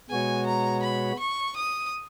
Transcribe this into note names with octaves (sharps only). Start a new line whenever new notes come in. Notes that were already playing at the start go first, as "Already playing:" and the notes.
B2 G#3 B3 F#4 C#5 G#5
A#5
B5
C#6
D#6